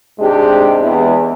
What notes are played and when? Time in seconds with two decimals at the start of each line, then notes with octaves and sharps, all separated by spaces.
0.19 G#2 C3 G#3 D4 G4
0.81 E2 G#3